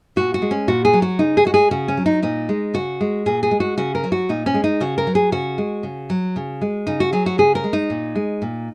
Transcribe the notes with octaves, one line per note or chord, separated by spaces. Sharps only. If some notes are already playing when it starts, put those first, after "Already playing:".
A#2 F#4
F#4
G#3
C#4
A#2 F#4
G#4
F#3
F#4
C#3 D#4
G#4
G#3 F#4
G#4
C#3 F#4
C#4
F#3
D#4
A#2 D#4
G#3
C#3 F#4
G#3
A#2 G#4
G#4
G#3
F#4
C#3 F#4
A#4
F#3
F#4
A#2 D#4
C#4
G#3
D#4
C#3 F#4
A#4
F#3
G#4
C#3 F#4
G#3
C#3
F#3
C#3
G#3
C#3 D#4
F#4
F#3 G#4
F#4
C#3 G#4
A#4
G#3
D#4
A#2
G#3
A#2